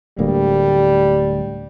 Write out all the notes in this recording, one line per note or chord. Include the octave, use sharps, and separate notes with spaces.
D1 D2 G3 A#3